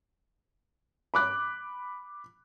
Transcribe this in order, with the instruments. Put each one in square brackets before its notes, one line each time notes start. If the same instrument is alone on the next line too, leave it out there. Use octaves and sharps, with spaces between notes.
[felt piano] B5 D6 F#6